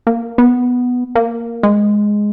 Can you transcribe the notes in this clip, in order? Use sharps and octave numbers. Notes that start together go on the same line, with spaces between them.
A#3
B3
A#3
G#3